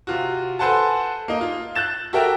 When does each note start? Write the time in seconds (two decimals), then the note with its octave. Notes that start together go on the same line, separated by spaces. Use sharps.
0.07 C3 F4 F#4
0.59 A4 B4 C5 F#5 G#5 A5
1.28 A#3 D#4
1.41 F4
1.75 F#6 G6 A6 E7
2.13 F#4 G4 A4 A#4 E5 G5